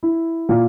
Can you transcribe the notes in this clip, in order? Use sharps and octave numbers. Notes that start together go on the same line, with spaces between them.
E4
A#2